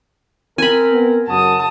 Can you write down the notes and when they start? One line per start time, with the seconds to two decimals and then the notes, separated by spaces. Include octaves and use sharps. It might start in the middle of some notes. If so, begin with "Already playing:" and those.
0.58 C4 A#4 G#5 B5
0.92 B3
1.28 F#2 C#3 F#4 A5 D#6